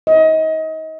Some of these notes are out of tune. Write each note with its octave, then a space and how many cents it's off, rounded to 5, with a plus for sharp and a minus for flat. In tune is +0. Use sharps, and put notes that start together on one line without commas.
D#5 +30